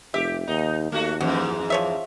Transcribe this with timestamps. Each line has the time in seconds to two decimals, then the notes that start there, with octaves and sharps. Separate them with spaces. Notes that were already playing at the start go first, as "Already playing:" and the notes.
0.14 F1 G4 E5
0.47 D#2 D#4
0.92 D#2 A3 F#4
1.21 F2 G#2 E3 F#4
1.70 F3 C#5 E5